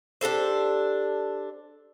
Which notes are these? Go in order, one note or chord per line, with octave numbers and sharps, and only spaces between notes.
D4 G4 A4 C5